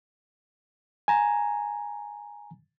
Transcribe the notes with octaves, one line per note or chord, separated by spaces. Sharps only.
G#5 A#5